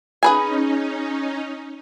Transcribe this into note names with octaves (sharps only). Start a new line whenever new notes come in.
C#4 D#4 G#4 B4 G#5